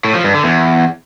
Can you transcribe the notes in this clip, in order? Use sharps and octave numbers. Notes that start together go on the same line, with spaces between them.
A2
F3
G2
D3
E2